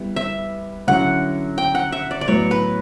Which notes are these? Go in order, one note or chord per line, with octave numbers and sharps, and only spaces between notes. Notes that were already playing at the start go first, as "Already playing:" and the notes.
Already playing: G3 B3 E4
E5
D3 F#3 C#4 E4 F#5
G5
F#5
E5
D5
D5
A2 F#3 B3 C#5
B4